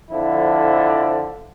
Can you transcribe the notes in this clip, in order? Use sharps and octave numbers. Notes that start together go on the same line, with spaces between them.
F2 D3 F3 E4